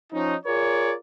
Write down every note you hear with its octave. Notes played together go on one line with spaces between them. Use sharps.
F3 C#4 D#4
F4 G#4 A#4 C#5 D5